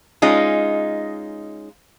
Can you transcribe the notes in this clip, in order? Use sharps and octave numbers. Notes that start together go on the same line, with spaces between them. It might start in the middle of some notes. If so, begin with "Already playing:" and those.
G#3 C#4 D#4 F4